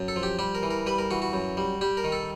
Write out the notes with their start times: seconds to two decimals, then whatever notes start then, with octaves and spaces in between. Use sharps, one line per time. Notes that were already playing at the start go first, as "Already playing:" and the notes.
Already playing: F#2
0.08 A4
0.16 F3
0.23 G4
0.39 G3 G4
0.55 A#4
0.63 E3
0.70 A#4
0.86 G3 B4
0.98 A#4
1.11 E3 F#4
1.22 F#4
1.33 F#2
1.57 G3
1.81 G3 G4
1.97 A#4
2.04 D#3
2.12 A4